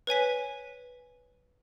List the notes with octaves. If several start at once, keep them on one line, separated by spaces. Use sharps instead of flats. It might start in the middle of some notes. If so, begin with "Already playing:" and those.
B4 C#5 G#5 B6